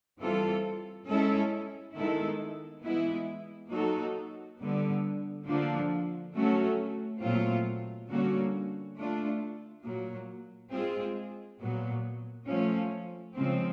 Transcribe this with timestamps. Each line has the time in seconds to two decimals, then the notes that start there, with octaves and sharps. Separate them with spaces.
0.21 E3 G3 C4 F4 A4
1.08 G#3 C#4 E4 A4
1.96 D#3 G#3 B3 E4 A4
2.84 E3 G#3 B3 E4
3.71 F#3 A#3 D#4 F#4 A4
4.59 D3 G3 B3
5.46 D3 F3 A#3 D4
6.34 F#3 A3 C#4 F#4 A4
7.21 A#2 F#3 A3 C4 F4
8.09 D3 G3 A#3 C#4 F#4
8.97 A3 D4 F4
9.84 A#2 F#3 A#3
10.72 G#3 C4 F4 G#4
11.60 A#2 F#3 B3
12.47 F3 A3 C#4
13.35 C#3 F3 G#3 C4